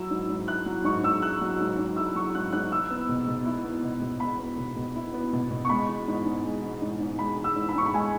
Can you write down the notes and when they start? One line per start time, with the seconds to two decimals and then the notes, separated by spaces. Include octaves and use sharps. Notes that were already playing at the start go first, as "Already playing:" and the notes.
Already playing: F#3 E4 E6
0.11 G#2
0.29 G#2
0.47 E4 F#6
0.66 F#3
0.84 G#2 C#6
1.03 G#2 E6
1.22 E4 F#6
1.41 F#3
1.60 G#2
1.78 G#2
1.96 E4 E6
2.15 F#3 C#6
2.35 G#2 F#6
2.52 G#2 F#6
2.72 E4 E6
2.91 B3
3.09 B2
3.28 B2
3.46 E4
3.65 B3
3.83 B2
4.01 B2
4.20 E4 B5
4.39 B3
4.58 B2
4.76 B2
4.96 E4
5.14 B3
5.33 B2
5.51 B2
5.65 C#6
5.70 G#3 B5
5.89 E3
6.08 G#2
6.25 G#2
6.45 G#3
6.64 E3
6.82 G#2
7.00 G#2
7.19 G#3 B5
7.37 E3
7.44 E6
7.56 G#2
7.69 B5
7.75 G#2 C#6
7.86 B5
7.93 G#3 G#5